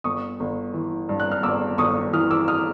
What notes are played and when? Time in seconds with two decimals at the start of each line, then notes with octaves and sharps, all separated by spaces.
0.04 G1 C#6 D#6
0.40 G1
0.74 E3
1.09 G2
1.20 F#6
1.32 F6
1.43 G1 D6 E6
1.78 G1 C#6 D#6
2.13 E3 D#6 F6
2.31 D6 E6
2.48 D#6 F6